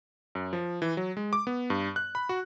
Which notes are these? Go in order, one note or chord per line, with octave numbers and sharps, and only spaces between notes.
F#2
F3
E3
F#3
G#3
D6
B3
G2
F#6
B5
F#4